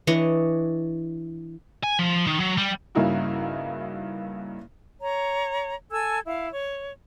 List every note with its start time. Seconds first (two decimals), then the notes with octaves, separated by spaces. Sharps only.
0.07 E3 D4 C#5 D#5
1.83 G#5
1.99 F3
2.27 D#3
2.40 F#3
2.58 G3
2.95 G2 C#3 A#3 D#4 E4 F#4
5.00 C#5 A#5
5.91 A4 G#5 E6 G#6
6.25 E4 F5
6.53 C#5